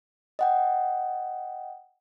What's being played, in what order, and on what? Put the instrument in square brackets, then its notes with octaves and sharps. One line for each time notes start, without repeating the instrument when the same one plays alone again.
[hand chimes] D#5 F#5 G5